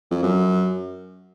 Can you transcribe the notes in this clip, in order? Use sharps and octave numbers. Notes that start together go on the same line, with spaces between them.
F2
F#2